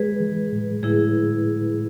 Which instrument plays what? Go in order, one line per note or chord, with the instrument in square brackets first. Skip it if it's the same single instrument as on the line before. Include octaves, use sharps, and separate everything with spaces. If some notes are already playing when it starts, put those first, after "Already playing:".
Already playing: [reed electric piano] G#3 [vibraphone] G#4 B4
[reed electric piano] E3
A2
[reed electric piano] A2 [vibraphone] E4 G#4